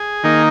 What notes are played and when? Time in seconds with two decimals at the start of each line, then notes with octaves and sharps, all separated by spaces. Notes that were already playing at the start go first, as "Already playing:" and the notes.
Already playing: G#4
0.23 D#3 A#3 D#4